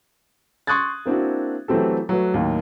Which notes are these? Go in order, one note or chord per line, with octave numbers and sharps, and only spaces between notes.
C6 C#6 D#6 F#6 G#6 A6
A#3 C4 D4 E4 F#4
E3 F#3 A3 C4 G4 A4
F#3 A3 B4
D#2 A2 D#3 F#3